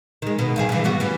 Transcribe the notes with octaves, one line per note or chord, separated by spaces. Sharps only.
D#3 G#3
B2
G2 D#3 G#4
G2 E3
G3 B3 F#4
E3 C#4